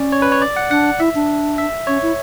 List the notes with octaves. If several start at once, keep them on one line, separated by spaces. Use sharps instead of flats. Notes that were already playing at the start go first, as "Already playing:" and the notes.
Already playing: C#4 D5
C#5
B4
C#5
D5
F#5
D4 F#5
E4 E5
D4
E5
C#4 C#5
E4